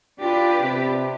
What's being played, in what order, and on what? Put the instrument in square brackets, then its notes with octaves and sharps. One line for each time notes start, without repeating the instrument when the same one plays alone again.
[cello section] D4 G4 B4 [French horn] F4
[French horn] C3